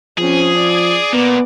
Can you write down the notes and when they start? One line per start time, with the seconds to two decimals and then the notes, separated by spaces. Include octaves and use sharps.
0.18 F3 C4 C#4 G#4
0.56 D5
1.13 A#2 B3